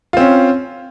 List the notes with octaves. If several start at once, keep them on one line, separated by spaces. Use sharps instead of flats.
C4 C#4 F4